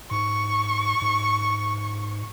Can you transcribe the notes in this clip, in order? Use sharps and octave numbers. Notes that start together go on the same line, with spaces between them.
G#2 C#6
G#2